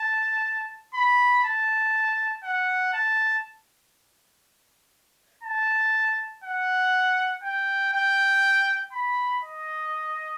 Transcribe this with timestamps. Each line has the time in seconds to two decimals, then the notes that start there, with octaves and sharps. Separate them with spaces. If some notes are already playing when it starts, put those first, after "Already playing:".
Already playing: A5
0.94 B5
1.44 A5
2.44 F#5
2.94 A5
5.43 A5
6.44 F#5
7.43 G5
7.94 G5
8.93 B5
9.43 D#5